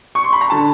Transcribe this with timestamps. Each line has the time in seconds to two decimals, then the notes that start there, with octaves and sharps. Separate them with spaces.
0.15 C#6
0.24 C6
0.33 B5
0.41 A#5
0.50 D3 A5